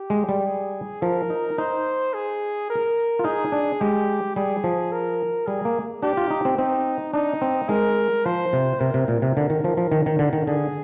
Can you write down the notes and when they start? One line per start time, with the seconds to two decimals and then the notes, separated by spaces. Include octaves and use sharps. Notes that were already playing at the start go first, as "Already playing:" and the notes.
Already playing: G4
0.10 G#3
0.29 G3
0.47 G#4
1.02 F3 A#4
1.30 D#4
1.58 D#4 C5
2.14 G#4
2.70 A#4
3.19 F4
3.24 D#4 G#4
3.52 D4
3.81 G#3 G4
4.36 G3 G#4
4.64 F3
4.92 A#4
5.47 G3 G#4
5.65 A#3
6.03 D4 G4
6.17 F4
6.31 D#4
6.45 C4
6.58 C4 D#4
7.13 D4 D#4
7.42 C4
7.69 G#3 A#4
8.26 F3 C5
8.53 C3
8.80 C3 A#4
8.94 C3
9.08 A#2
9.22 C3
9.37 D3
9.50 D#3
9.64 F3
9.77 F3
9.92 D#3
10.06 D#3
10.19 D3
10.33 D#3
10.47 D3 G#4